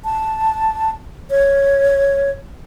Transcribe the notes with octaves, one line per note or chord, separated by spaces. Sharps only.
A5
C#5